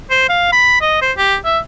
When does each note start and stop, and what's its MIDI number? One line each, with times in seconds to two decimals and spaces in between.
0.11 0.28 72
0.29 0.51 77
0.52 0.77 83
0.81 1.00 75
1.02 1.12 72
1.18 1.36 67
1.45 1.59 76